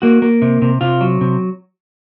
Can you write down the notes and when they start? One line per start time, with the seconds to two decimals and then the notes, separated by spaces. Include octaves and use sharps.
0.02 A#3 F#4
0.22 A#3
0.42 C3
0.62 C3
0.81 C3 F4
1.01 F#3
1.21 C3